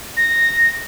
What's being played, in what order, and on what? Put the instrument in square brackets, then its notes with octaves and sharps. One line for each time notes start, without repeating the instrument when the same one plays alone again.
[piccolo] A#6